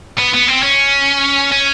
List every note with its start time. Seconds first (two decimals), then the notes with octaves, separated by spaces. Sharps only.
0.18 B3
0.34 B3
0.48 C4
0.62 C#4
1.52 C#4